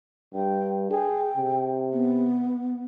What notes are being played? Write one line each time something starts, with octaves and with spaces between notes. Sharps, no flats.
G2 G5
G#4 G5
C3
B3